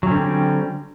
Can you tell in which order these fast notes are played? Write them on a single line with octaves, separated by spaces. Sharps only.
F#3 C#4 D3 C4 G3